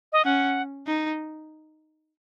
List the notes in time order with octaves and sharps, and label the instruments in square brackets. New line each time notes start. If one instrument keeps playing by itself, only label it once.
[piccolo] D#5
[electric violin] C#4 [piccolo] F#5
[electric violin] D#4